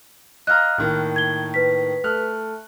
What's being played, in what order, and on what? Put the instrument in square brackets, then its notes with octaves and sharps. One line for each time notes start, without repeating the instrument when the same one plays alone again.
[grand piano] D#5 F5 A#5 [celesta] F6 F#6
[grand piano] A2 D#3 A#3
[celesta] G#6 G7
B4 B6
[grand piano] A3 F6 F#6